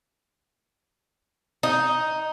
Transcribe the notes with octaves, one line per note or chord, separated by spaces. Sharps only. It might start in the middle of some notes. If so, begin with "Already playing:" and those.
D#4